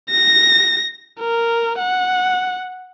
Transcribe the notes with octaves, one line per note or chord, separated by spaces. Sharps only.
A#6
A#4
F#5